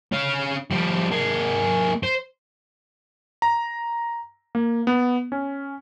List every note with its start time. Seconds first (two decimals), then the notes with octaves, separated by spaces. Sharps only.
0.12 C#4 F5
0.71 F3 G3
1.11 A#3 G#4
2.03 C5
3.42 A#5
4.55 A#3
4.87 B3
5.32 C#4